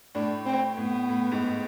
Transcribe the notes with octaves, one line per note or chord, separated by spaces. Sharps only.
A2 D4
C4
A2 B3
A2
G#2